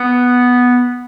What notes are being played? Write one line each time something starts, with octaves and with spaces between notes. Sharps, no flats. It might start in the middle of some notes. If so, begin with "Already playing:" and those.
Already playing: B3